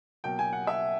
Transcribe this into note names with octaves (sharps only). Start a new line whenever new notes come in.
B2 F#3 A#3 G5
G#5
F#5
E5